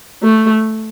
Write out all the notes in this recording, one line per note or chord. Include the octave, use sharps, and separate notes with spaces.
A3